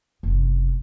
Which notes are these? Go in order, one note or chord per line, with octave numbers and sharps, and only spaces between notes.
F#1 C3